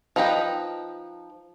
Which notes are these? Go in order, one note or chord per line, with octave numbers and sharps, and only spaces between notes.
F3 D#4 B4 D#5 G5